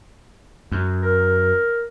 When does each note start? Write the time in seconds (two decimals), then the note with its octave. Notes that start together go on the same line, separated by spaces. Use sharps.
0.72 F#2
1.02 A#4